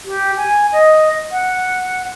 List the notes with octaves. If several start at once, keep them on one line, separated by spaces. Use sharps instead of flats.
G4
G#5
D#5
F#5